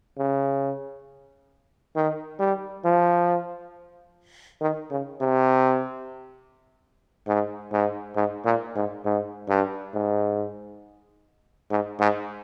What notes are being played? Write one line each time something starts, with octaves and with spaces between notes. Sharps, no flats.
C#3
D#3
G3
F3
D#3
C#3
C3
G#2
G#2
G#2
A#2
G#2
G#2
G2
G#2
G#2
G#2